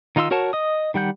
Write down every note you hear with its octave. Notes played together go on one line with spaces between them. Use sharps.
D#3 D#4 F4 C6 E6
F#4 A#4 C#5 F#5 A5
D#5 D#6
D#3 G3 F#5 G6